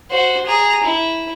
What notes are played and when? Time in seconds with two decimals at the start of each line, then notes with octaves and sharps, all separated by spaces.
0.11 F#4 C5
0.46 G#4 A#5
0.83 E4